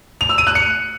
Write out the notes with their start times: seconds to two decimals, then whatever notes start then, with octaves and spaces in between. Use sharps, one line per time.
0.21 F7
0.29 E6
0.38 D#7
0.47 F#6
0.55 C#7